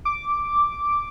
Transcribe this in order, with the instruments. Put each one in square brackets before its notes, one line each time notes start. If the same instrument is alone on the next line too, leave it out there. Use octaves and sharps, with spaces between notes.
[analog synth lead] D6